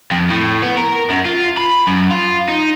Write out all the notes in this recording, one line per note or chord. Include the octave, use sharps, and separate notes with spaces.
F2
A2
B3
A#4
F#2
F4
B5
F#2
F4
D#4